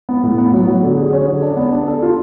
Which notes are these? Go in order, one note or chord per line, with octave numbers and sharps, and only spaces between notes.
B3
A2
B3
F#3
F#3
D3
G#4
C#4
D3
D4
B3
D4
A4
F4